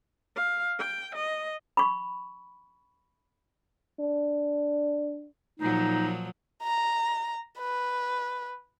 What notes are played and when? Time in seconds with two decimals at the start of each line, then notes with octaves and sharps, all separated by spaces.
0.36 F5
0.79 G5
1.15 D#5
1.77 B5 C#6
3.99 D4
5.60 A#2 F3 F#3 D#4
6.63 A#5
7.59 B4